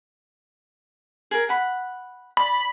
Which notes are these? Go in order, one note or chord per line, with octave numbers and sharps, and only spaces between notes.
G#4 A#4
F#5 B5
D5 B5